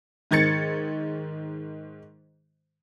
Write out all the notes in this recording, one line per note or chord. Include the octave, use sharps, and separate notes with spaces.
G#2 D#3 G#6 A6 C#7